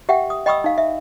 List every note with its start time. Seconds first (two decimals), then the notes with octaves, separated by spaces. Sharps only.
0.09 G4 E5 F#5 G5
0.30 D#6
0.46 D#5 G5 B5 C#6 D#6 E6
0.64 D#4 F5
0.78 E5